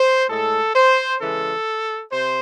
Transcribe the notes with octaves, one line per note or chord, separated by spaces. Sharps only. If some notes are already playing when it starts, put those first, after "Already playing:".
Already playing: C5
A2 G#3 A4
C5
C#3 E3 G#3 A4
C3 C5